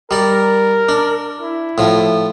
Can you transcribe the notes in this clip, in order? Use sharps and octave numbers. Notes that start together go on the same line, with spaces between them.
G3 A#4 D5
D4
E4
A2 F3